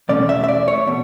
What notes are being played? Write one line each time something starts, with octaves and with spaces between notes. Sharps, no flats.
E2 B2 A3 C#4 D5
E5
E5
D5
C#5
B2